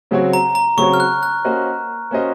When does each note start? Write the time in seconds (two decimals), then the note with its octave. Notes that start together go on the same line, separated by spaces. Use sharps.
0.11 C#3 F#3 C4 F#4 C#5
0.33 A#5
0.55 A#5
0.77 C#3 F#3 C4 F#4 C#5 C#6
0.94 F6
1.00 F#6
1.23 F#6
1.44 A#3 C#4 F#4 C5 D#5
2.11 A#3 C#4 F#4 C5 D#5